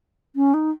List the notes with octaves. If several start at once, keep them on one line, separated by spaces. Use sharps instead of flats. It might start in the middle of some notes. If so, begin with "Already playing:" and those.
C#4
D#4